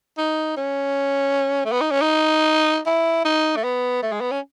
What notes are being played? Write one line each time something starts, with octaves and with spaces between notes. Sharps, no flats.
D#4
C#4
A3
B3
D#4
C#4
D#4
E4
D#4
A3
B3
A3
G#3
B3
C#4